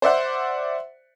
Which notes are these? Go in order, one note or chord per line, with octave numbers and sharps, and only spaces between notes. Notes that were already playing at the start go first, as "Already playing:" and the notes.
C5 D5 E5 F#5